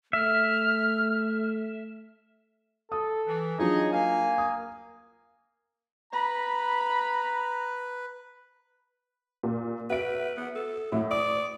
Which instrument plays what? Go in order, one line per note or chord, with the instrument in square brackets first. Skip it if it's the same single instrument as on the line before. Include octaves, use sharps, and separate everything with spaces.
[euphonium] A3 [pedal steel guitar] E5 [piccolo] F6
[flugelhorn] A4 [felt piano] D#6
[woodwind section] E3
[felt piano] F#3 D4 F4 [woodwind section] D#4 C#5 D#5 [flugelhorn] G#4
[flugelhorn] A#3 [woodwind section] F5 G#5
[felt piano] D#6
[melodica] B4 [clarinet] A#5 [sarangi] B5
[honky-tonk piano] A#2
[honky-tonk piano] F#4 E5 D7 [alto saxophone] B4
[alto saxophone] B3
A4
[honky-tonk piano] A2 E4 [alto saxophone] F#3
[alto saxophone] D5 [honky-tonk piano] D#6